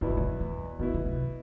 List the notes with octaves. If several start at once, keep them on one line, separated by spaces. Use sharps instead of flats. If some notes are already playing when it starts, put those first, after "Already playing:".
E2 B2 D3 B3 E4
E3
D3
E3
B2 D3 B3 E4
D3
C3